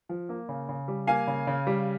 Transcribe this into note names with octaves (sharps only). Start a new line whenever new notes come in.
F3
A#3
C#3
C#3
G3
A#3 F5 G#5
C#3
C#3
G3